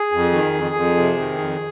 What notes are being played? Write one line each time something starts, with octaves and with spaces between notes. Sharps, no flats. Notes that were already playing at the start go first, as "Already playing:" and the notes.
Already playing: G#4
F2
D#3
F2
F2
C3
D#3
F2